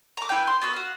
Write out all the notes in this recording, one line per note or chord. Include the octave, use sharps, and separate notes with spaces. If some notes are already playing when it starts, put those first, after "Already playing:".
A#5 D6
E4 B4 G5 G6
C6
B3 F#4 E6
F#4 F5